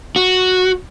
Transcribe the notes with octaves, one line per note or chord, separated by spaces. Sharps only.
F#4